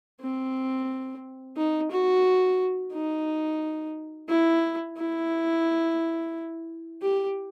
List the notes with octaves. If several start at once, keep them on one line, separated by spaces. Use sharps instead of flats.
C4
D#4
F#4
D#4
E4
E4
G4